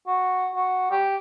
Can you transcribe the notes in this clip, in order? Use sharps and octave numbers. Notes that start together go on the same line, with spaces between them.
F#4
F#4
G4